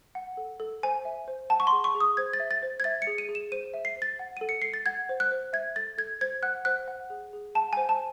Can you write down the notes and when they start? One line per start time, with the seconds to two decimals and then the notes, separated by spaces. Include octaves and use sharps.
0.15 F#5
0.37 A4
0.60 A4
0.83 C5 G#5
1.05 E5
1.28 C5
1.50 F#5 A5
1.60 C#6
1.67 C6
1.72 G#4
1.84 C#6
1.95 G#4
2.00 D#6
2.17 C5 G#6
2.33 A6
2.40 E5
2.51 A6
2.63 C5
2.80 G#6
2.84 E5 A6
3.02 C#7
3.07 G#4
3.18 D#7
3.29 G#4
3.35 E7
3.52 C5 D#7
3.74 E5
3.85 C7
3.97 C5
4.02 A6
4.19 F#5
4.37 A4 D#7
4.49 C#7
4.62 A4 C7
4.74 A6
4.86 F#5 G#6
5.09 C5
5.20 F#6
5.32 C5
5.53 E5 G#6
5.76 A4 A6
5.98 A4 G#6
6.21 C5 G#6
6.43 F#5 F#6
6.65 C5 F#6
6.88 F#5
7.10 G#4
7.33 G#4
7.55 F#5 A5
7.73 G#5
7.77 C5
7.89 A5